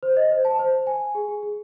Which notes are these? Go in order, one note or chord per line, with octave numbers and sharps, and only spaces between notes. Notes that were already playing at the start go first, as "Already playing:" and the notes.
C5
D#5
C5
A5
C5
C5
G#5
G#5
G#4
G#4
G#4